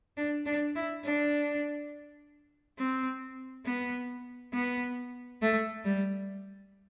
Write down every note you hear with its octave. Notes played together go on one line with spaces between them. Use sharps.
D4
D4
E4
D4
C4
B3
B3
A3
G3